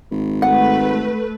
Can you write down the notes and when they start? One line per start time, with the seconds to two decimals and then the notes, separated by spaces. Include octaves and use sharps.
0.11 G#1
0.42 A3 B4 F#5